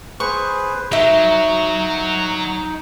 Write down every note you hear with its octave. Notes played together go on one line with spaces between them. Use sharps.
G#4 B4 C5 C#6
F#3 D#4 A#4 E5